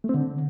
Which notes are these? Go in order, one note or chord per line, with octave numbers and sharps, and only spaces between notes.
A3
C4
D3